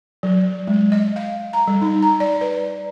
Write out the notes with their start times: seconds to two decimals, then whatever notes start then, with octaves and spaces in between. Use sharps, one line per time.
0.23 F#3
0.67 G#3
0.92 D#5
1.16 F5
1.53 A#5
1.67 G3
1.82 D#4
2.02 A#5
2.20 D5
2.41 B4